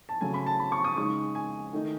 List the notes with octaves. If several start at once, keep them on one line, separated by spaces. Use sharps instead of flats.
A5
C#3 F#3 A3 C#4 G#5
B5
A5
B5
C#6
D#6
C#3 G#3 D#4 C#6
G#5
D#3 A3 D#4